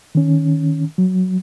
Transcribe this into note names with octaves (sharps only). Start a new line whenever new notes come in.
D#3 C#4
F#3